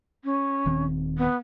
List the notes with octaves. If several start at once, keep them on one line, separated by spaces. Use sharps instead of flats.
C#4
D#1 D#3 C4
B3